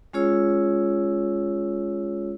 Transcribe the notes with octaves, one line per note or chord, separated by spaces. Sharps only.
G#3 C#4 F4 G#4 C#5 E6